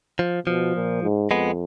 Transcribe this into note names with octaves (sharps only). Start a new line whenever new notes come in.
F3
B2 F3
A#2
G#2
F2 G#3 B3